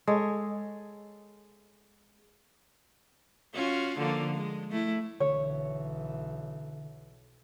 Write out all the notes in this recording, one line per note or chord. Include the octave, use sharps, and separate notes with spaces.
G#3 A4 C#5
C#4 F4 F#4
D3 F3 A#3
G#3
A3 E4
B1 D3 E3 C#5